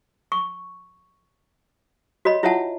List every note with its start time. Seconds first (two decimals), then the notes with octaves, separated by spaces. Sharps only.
0.32 C#6
2.25 F#4 C#5 D#5 B5
2.43 E4 F4 C#5 E5 F#5 A5